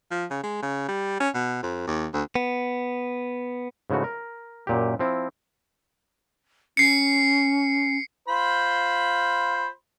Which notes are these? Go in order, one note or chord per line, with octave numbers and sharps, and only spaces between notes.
F3
C#3
G#3
C#3
G3
C#4
B2
F2
D#2
D2
B3
G#2 C#3 E3 A3 F#4
A#4
F#2 A#2 G4
F3 C4 E4
C#4 C7 C#7
F4 C5 B5